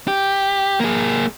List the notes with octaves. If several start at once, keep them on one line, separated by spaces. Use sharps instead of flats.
G4
A#3 G#4